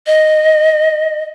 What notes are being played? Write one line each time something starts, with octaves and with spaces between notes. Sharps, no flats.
D#5